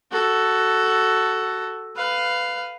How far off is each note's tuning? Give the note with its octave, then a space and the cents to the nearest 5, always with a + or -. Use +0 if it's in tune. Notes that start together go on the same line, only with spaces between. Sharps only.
F#4 +10 A4 +0
B4 +15 F5 +0